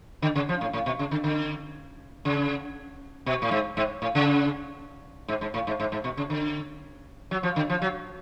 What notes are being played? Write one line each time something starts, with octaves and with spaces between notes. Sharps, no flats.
D3
C#3
F3
A2
A2
B2
C#3
D3
D3
C#3
B2
A2
G#2
G#2
A2
C#3
G#2
G#2
A2
G#2
G#2
G#2
B2
C#3
D3
F#3
F3
D3
F3
F#3